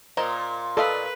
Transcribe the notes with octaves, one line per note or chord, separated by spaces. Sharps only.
A#2 A#4 C5 D#5
A4 B4 D5 D#5 F5